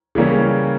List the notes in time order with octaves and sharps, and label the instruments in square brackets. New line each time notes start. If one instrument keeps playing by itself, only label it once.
[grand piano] C#3 E3 G3 A#3 C#4